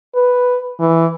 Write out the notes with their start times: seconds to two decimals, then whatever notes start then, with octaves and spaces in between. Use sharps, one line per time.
0.15 B4
0.80 E3